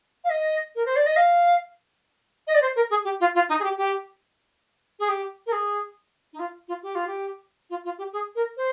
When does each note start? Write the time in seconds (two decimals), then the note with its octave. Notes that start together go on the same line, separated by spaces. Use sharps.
0.24 F5
0.30 D#5
0.76 A#4
0.86 C5
0.96 D5
1.06 D#5
1.16 F5
2.47 D#5
2.55 D5
2.62 C5
2.76 A#4
2.90 G#4
3.05 G4
3.20 F4
3.35 F4
3.49 D#4
3.60 G#4
3.64 G4
3.78 G4
4.99 G#4
5.09 G4
5.47 A#4
5.52 G#4
6.33 D#4
6.39 F4
6.68 F4
6.83 G4
6.95 F4
7.07 G4
7.70 F4
7.85 F4
7.98 G4
8.13 G#4
8.35 A#4
8.57 C5